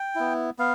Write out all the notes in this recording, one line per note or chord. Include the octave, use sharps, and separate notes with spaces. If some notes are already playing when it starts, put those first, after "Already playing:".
Already playing: G5
B3 E4
B3 F5